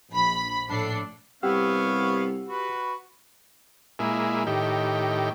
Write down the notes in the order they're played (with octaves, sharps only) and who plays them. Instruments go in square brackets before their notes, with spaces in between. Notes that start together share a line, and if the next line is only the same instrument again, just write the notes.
[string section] A#1 B5
A#1 A2 D4 A4 C7
[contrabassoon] C2 [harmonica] B3 C#5 F5 [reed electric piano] G4 F#5 E6
[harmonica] F#4 B4
[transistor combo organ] A#2 G#3 E4
A2 D#3 G4